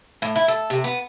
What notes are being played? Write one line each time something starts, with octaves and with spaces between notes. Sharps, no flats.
A2
E4
A4
C3
B3